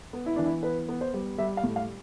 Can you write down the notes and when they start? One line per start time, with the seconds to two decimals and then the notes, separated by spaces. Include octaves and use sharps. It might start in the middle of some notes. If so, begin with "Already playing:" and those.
0.13 B3
0.26 E4
0.36 E3 D4
0.46 E4
0.63 B3 B4
0.88 B3
1.01 C5
1.14 G3
1.38 G3 E5
1.57 F5
1.63 A2
1.76 F5